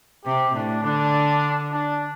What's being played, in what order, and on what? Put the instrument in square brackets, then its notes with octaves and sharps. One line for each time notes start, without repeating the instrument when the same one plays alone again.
[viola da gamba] C3 [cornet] G4
[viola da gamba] A2 [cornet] D4
[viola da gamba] D3 [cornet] D4
[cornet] D4